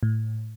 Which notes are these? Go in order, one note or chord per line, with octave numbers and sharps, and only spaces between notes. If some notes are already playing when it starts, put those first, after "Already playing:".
A2